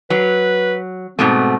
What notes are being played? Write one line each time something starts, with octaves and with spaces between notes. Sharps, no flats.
F#3 B4
G#2 B2 A3 C4